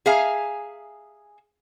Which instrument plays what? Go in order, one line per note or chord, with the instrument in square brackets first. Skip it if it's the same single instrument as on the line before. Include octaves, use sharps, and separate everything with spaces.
[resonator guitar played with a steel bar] G#4 E5 F5 G#5 A#5